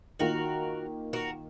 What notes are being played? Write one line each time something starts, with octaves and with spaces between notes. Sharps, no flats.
D#3 A#3 F4 F#4 A#4
F#4 A#4